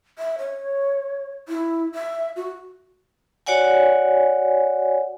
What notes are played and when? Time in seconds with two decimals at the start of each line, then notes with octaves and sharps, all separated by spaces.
0.19 E5
0.38 C#5
1.49 E4
1.95 E5
2.36 F#4
3.46 F#4 C#5 D5 F#5 G#5